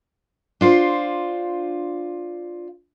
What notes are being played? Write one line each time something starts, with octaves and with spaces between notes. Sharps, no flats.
D4 F4 C5